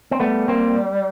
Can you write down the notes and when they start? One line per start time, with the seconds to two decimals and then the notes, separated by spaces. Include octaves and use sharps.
0.11 C4
0.20 G3 A3 B3
0.48 A#3 C4